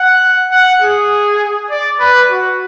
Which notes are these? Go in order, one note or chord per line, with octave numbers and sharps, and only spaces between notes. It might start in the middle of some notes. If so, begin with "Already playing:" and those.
Already playing: F#5
F#5
G#4
D5
B4
F#4